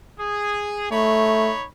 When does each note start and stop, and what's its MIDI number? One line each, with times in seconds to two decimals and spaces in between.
0.19 0.91 68
0.92 1.50 57
0.92 1.66 63
0.92 1.66 73
0.92 1.66 83